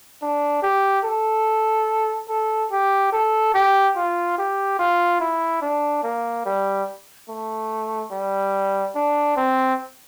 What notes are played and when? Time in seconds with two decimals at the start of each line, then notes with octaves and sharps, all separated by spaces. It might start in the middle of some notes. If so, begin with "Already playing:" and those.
0.22 D4
0.63 G4
1.05 A4
2.29 A4
2.72 G4
3.12 A4
3.54 G4
3.97 F4
4.38 G4
4.79 F4
5.20 E4
5.62 D4
6.03 A#3
6.46 G3
7.29 A3
8.11 G3
8.95 D4
9.37 C4